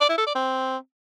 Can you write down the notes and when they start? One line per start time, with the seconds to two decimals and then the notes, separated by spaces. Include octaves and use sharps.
0.01 D5
0.09 E4
0.18 A4
0.27 D5
0.35 C4